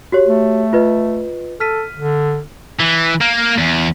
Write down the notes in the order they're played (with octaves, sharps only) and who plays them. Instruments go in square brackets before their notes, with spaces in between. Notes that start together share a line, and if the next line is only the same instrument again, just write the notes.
[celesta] F#4 G4 C#5
[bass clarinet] A3
[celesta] F4 B4 D#5
[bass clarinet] A4 [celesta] F6 B6 D#7
[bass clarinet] D3
[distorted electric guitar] E3
A#3
E2